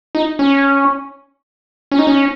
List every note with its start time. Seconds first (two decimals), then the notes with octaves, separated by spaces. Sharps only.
0.15 D#4
0.39 C#4
1.92 C#4
1.99 D#4
2.07 C#4